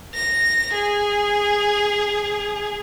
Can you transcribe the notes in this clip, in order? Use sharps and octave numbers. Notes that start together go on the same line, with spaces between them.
A#6
G#4